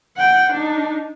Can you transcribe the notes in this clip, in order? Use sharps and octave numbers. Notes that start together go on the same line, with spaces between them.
F#5 G5
D4 D#4